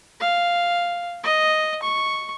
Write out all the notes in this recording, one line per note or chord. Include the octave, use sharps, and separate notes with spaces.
F5
D#5
C#6